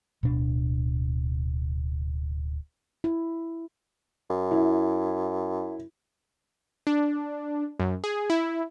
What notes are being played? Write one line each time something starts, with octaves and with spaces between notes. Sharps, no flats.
D1 B2 D4
E4
F#2
E4
D4
F#2
G#4
E4